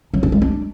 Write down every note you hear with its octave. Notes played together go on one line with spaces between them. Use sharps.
F#3
D4
G#3
D4